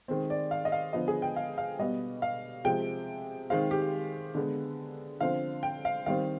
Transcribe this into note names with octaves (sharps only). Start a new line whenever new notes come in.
D#3 G#3 C4
D5
F5
D#5
F5
D3 F3 B3 D#5
G#4
G5
F5
F5
B2 G3 B3 D#5
F5
C3 F3 G#3 G5
D#3 G#3 C4 F5
G4
D3 G#3 B3
D3 F3 C4 F5
G5
F5
D#3 G3 C4 F5